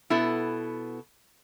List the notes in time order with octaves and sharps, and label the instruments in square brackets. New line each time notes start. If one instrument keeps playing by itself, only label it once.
[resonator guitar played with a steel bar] B2 B3 E4 A4